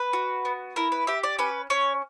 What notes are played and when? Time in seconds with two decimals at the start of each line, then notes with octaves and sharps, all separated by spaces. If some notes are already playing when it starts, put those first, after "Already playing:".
Already playing: B4
0.13 F#4
0.45 B3
0.76 E4 A#4
0.92 B4
1.07 G4 E5
1.23 D5
1.39 C#4 B4
1.70 C#4 C#5